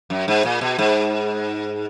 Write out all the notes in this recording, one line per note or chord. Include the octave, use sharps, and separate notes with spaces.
F#2
G#2
A#2
B2
G#2